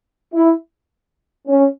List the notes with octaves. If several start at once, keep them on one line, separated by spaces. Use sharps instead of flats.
E4
C#4